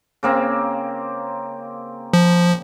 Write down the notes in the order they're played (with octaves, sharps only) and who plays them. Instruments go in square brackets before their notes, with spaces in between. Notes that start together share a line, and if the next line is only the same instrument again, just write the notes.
[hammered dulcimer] C#3 A#3 C4
[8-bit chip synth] F3